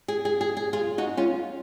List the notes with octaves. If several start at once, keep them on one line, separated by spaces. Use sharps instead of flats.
G#4
G#4
G#4
G#4
F4 G#4
D#4 F#4
C#4 F4